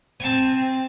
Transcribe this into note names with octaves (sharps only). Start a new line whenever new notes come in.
C4 G#5 A5